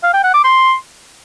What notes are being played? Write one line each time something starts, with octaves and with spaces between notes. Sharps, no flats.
F5
G5
F#5
D6
C6